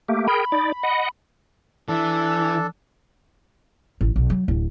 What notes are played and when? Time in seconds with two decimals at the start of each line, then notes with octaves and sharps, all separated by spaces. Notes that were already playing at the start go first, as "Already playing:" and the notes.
0.08 A3 A#3 G4
0.27 G#4 A#4 G5 B5
0.52 D#4 D5
0.83 D#5 F#5
1.88 E3 D4 A4
4.01 A1
4.16 B1
4.30 F#3
4.48 D1